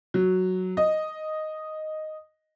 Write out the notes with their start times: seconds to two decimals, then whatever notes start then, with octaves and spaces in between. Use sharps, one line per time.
0.14 F#3
0.77 D#5